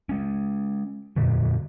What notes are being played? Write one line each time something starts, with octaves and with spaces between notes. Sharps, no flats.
G#3 C#4
F2 A#2 D3 F#3